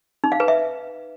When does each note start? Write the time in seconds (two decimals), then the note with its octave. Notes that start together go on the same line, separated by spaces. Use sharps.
0.24 D#4
0.32 F5
0.40 B4
0.48 E5